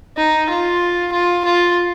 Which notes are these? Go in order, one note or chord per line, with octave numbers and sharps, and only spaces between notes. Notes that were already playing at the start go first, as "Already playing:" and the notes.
D#4
F4
F4
F4